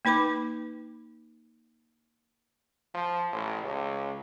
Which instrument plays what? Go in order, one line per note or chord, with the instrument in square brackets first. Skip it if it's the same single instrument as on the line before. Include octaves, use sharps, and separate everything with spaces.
[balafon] A#3 D#4 B4 B5 D6
[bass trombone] F3
A1
C#2